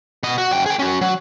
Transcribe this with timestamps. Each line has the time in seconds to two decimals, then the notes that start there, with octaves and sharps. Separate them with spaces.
0.23 B2 D#5
0.38 F#4
0.52 F#2 G5
0.66 G#4 G5
0.79 C#4 F#4
1.01 F#3